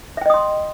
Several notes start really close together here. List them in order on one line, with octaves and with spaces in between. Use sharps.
E5 G5 D#5 D#6 C6